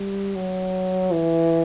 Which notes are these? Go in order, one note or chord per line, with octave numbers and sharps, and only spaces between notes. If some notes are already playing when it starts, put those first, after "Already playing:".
Already playing: G3
F#3
E3